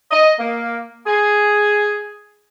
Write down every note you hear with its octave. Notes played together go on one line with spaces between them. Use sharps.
D#5
A#3
G#4